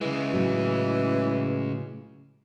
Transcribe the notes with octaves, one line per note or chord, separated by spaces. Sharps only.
C#3 E3 G#3
A2 F#3